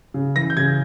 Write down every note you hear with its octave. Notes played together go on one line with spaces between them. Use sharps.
C#3
E3 A#6
G6
C#3 G#6